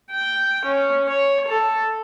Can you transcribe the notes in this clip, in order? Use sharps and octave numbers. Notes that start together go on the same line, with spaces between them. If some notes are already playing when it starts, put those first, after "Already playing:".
G5
C#4
C#5
A4